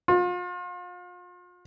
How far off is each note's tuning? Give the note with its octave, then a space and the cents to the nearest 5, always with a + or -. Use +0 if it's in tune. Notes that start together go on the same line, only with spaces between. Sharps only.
F4 +35